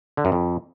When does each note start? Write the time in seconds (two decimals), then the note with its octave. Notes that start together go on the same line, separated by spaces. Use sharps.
0.17 D3
0.25 F#2
0.32 F2